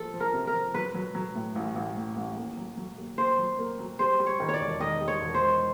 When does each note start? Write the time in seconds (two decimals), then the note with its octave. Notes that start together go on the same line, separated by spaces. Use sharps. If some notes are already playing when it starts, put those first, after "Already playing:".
Already playing: F3 A#3 A4
0.13 F3
0.20 A#4
0.34 C3
0.47 A#4
0.54 F3
0.74 F#3 B4
0.94 F#3
1.15 F#3
1.35 A2
1.55 A1
1.76 A1
1.97 A2
2.16 A1
2.37 D#2
2.57 F#3
2.77 F#3
2.98 D#2
3.18 D#2 C5
3.38 F#3
3.59 A#3
3.79 F#3
3.99 G3 C5
4.19 G3
4.26 C#5
4.40 D#3
4.49 C#5
4.54 D5
4.60 E1
4.80 D#3 D#5
5.01 G3
5.08 C#5
5.21 E1
5.34 C5
5.41 E1